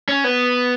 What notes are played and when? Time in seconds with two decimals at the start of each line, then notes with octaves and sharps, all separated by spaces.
0.09 C#4
0.24 B3